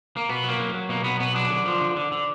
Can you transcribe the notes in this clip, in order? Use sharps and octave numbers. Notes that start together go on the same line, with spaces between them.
A#3
B2 B3
F#3
A#3
F#3
F#3
B2 A#3
F#3 B3
B2 B3
F#3 D4
D3
F3
D3
D3
D3